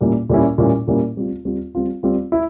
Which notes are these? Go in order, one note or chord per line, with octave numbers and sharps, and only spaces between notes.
A#2 G3 A#3 C#4 E4
A#2 G3 A#3 C#4 E4
A#2 G3 A#3 C#4 E4
A#2 G3 A#3 C#4 E4
G3 C4 F4
G3 C4 F4
G3 C4 F4
G3 C4 F4
E4